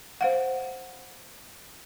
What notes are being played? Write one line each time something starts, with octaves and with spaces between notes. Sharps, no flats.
C5 F5 F#5